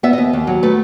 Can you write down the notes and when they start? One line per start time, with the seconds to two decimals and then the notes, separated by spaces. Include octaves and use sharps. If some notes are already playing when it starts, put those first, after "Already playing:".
0.03 B3 E5
0.13 D#5
0.18 D#2
0.33 D#2
0.47 F#3
0.63 A3 B4